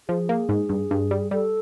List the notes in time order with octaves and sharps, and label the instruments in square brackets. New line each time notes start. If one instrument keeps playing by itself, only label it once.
[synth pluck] F3 [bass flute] G#4
[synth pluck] A#3
G#2
G2
G2
G3
[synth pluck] G3 [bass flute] A4